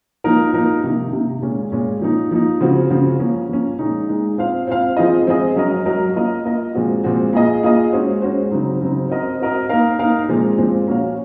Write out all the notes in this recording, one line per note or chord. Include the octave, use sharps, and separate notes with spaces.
F3 A#3 D#4 A#4
F3 A#3 D#4 A#4
C3 D#3 A#3
C3 D#3 A#3
A#2 G#3 C#4
A#2 G#3 C#4
F3 A#3 D#4
F3 A#3 D#4
C#3 F3 C4 F#4
C#3 F3 C4 F#4
F3 A#3 C#4
F3 A#3 C#4
A#2 G#3 D#4
A#2 G#3 D#4
C4 F4 C5 F5
C4 F4 C5 F5
F3 C4 F4 G#4 D#5
F3 C4 F4 G#4 D#5
F#3 C#4 F#4 A#4 D#5
F#3 C#4 F#4 A#4 D#5
A#3 F4 A#4 D#5
A#3 F4 A#4 D#5
A#2 F3 G#3 C4 F#4
A#2 F3 G#3 C4 F#4
A#3 F4 G#4 D#5
A#3 F4 G#4 D#5
G#3 C#4 F#4 C5
G#3 C#4 F#4 C5
C#3 F#3 C4 D#4
C#3 F#3 C4 D#4
C4 F#4 A#4 D#5
C4 F#4 A#4 D#5
A#3 D#4 A#4 F5
A#3 D#4 A#4 F5
A#2 F3 G#3 C4
A#2 F3 G#3 C4
A#3 C#4 F#4 C#5 F5